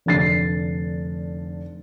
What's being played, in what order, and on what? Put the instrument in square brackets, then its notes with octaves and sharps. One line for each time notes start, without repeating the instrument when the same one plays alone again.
[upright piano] F1 D3 A6 C7